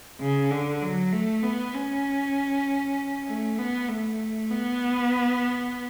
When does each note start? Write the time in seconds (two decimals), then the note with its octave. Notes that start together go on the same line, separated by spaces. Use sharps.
0.20 C#3
0.51 D3
0.82 F#3
1.13 A3
1.43 B3
1.74 C#4
3.28 A3
3.59 B3
3.89 A3
4.51 B3